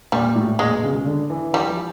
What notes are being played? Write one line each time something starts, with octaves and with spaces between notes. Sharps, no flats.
A#2 G3
A2
A#2 G#3
B2
C#3
C#3
D3
E3
E3 G3
F3